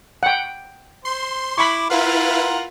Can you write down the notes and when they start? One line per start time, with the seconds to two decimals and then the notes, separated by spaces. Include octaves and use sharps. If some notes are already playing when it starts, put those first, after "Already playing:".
0.23 F#5 G5
1.05 C5 C6
1.58 E4 B5 C#6 D6
1.90 E4 F4 A#4 B4 F5 F#5